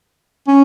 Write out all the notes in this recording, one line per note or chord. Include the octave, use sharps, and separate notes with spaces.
C#4